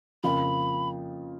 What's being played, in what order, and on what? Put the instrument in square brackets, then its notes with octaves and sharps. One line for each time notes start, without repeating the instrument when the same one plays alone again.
[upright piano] F2 C#3 F3 A#3 F4 [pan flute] B5